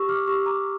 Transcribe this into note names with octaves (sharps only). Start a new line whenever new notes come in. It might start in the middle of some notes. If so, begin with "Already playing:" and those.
Already playing: G4 C#6 E6
D6 F6
G4 C#6 E6
A#5 D6